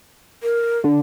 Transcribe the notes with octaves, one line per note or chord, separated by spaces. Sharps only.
A#4
D3